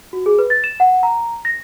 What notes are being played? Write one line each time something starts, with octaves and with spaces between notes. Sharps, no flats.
F#4
G#4
B4
A6
E7
F#5
A#5
A#6